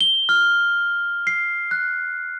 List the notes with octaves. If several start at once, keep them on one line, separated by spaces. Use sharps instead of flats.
G7
F6
C7
F#6